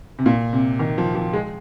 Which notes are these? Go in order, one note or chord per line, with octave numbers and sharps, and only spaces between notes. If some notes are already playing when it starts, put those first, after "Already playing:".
C3
A#2
C3
D#3
F3
F3
G#3